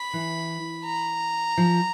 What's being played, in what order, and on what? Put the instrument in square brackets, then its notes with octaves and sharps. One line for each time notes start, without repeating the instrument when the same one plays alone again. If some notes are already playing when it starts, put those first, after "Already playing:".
Already playing: [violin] B5
[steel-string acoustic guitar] E3
[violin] A#5
[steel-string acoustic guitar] F3